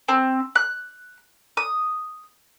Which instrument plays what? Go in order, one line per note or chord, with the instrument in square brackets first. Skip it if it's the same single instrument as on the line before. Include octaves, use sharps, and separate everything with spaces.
[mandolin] C4
F#6
D#6